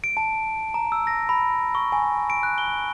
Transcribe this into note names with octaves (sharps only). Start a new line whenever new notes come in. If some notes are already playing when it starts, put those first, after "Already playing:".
D7
A5
A#5
E6
A#6
B5
C#6
G#5
D7
F#6
G7